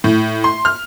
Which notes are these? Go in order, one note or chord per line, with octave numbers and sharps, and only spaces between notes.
A2
C6
F6